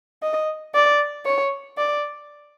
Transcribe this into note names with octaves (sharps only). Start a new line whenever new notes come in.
D#5
D5
C#5
D5